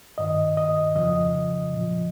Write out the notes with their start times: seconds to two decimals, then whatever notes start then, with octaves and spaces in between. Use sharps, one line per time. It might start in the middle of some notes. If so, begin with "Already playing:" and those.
0.18 G2 D#3 D#5
0.57 D#5
0.95 F2 C#3 F3 D#5
1.73 A#2 F3